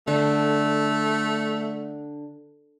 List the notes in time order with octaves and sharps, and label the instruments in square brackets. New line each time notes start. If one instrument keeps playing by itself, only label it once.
[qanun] D3 [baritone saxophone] A3